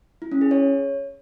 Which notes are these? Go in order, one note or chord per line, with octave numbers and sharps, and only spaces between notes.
E4
C#4
G#4
C#5